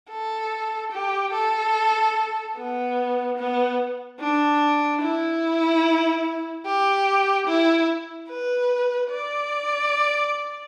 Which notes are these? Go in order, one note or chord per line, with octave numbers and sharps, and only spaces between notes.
A4
G4
A4
B3
B3
D4
E4
G4
E4
B4
D5